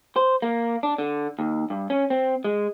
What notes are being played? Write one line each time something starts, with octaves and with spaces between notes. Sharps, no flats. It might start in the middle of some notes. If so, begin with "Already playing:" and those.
C5
A#3
D4
D3
D#2
G2
C#4
C4
G#3